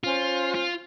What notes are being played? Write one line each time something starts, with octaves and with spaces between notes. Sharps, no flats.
C#4 F4 C5
F4